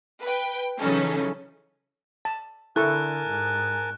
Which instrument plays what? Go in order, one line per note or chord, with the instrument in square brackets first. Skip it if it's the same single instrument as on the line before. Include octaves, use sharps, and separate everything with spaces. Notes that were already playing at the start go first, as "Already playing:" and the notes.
[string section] B4 G5
C#3 E3 F#3 C#4 D#4 A4
[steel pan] A5
[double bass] D3 [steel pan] E4 A4 C#6 [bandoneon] A#4 G#5 A5 [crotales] F#6
[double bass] G#2